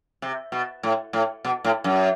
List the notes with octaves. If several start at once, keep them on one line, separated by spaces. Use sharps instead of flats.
C3
B2
A2
A2
B2
A2
F#2